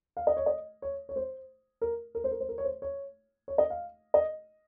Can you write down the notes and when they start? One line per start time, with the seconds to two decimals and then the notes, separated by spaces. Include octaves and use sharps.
0.17 F5
0.27 D#5
0.37 C#5
0.46 D#5
0.82 C#5
1.09 C#5
1.16 C5
1.81 A#4
2.15 A#4
2.24 C5
2.32 A#4
2.40 C5
2.49 A#4
2.58 C#5
2.64 C5
2.82 C#5
3.48 C#5
3.58 D#5
3.70 F5
4.14 D#5